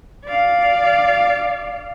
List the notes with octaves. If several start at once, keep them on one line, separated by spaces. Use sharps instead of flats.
D5 F5